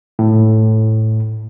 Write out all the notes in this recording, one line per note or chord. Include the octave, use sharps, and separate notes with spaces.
A2